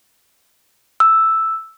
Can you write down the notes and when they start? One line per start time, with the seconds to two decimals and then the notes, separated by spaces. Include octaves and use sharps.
1.00 E6